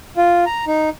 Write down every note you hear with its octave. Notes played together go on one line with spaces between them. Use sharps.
F4
A#5
D#4